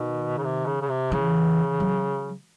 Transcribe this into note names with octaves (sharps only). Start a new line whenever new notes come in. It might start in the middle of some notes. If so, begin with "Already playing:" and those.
Already playing: B2 D#3
C#3
C3
C#3
C#3
C3
C#3 E3
F#3